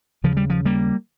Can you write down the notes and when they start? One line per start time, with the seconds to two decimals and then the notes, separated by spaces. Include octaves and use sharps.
0.24 D#2 C#3 F3
0.37 G3
0.50 F3
0.66 G3 A#3